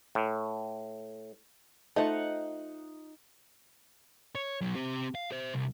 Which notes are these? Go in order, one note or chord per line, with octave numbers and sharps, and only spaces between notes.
A2
A3 D#4 F4 C5 D#5 F#5
C#5
B1 F#3
C4 G4
F5
C5 E5
C2